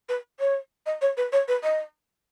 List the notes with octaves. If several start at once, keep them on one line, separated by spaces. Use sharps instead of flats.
B4
C#5
D#5
C#5
B4
C#5
B4
D#5